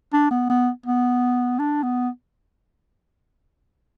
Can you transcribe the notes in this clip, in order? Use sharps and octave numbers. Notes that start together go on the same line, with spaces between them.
D4
B3
B3
B3
D4
B3